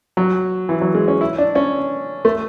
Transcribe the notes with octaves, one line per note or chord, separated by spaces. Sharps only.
F#3
E3
F#3
G#3
C#4
E4
D4
C#4
A3